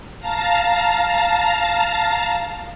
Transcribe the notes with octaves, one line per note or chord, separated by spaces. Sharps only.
F5 A5 A#5